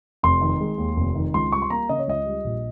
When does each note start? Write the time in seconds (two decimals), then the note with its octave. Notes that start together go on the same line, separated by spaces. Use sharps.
0.23 F1 C6
0.41 D#3
0.61 G#3
0.78 D#2
0.96 F1
1.15 D#3
1.34 C#2 C6
1.52 G3 C#6
1.62 C6
1.70 A#3 A#5
1.89 C#3 D#5
1.99 C#5
2.07 C#2 D#5
2.26 G3
2.44 A#1